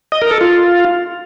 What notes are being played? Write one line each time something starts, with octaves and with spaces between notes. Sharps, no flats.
D#5
A#4
A4
F4